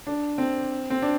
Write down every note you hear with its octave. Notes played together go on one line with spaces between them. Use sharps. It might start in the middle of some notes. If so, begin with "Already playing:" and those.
D4
C4
C4
D4